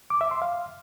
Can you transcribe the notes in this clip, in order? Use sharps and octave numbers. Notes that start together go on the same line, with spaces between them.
D6
E5
C6
F5